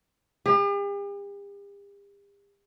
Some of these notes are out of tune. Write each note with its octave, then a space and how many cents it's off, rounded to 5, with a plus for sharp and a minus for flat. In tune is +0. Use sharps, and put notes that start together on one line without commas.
G4 +45